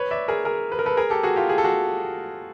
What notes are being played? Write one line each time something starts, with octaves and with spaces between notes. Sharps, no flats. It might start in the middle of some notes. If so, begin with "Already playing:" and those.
Already playing: B4 C#5
D5 E5
G#4 A#4
G#4 A#4
B4
A#4
A4 B4
G#4 A#4
G4 A4
F#4 G#4
F4 G4
G#4
A4
F#4 G#4